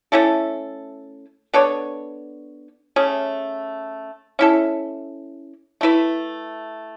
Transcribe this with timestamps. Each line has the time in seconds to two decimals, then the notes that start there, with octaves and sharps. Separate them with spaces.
0.12 A3 C#4 E4 A4
1.54 B3 D4 A4 C#5
2.96 A3 C#4 G#4
4.39 C#4 E4 A4
5.81 A3 E4 B4